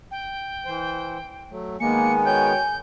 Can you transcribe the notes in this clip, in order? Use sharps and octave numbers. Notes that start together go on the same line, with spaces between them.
G5
E3 C5
F#3 A3
D#3 G#3 A#3 B3 G#5 C#7
F#4 C#5 G5 G6